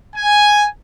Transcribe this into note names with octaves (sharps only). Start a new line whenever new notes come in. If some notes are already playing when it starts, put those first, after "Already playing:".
G#5